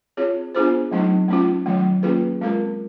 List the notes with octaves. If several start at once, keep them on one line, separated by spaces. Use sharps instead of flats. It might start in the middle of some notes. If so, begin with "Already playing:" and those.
C4 F4 G#4 C#5
B3 D4 F4 G#4 C5
F#3 A3 C4 D#4
A3 C#4 F4
D#3 F#3 A3
A#3 C#4 F4 G#4 B4
G#3 C4 F4 A#4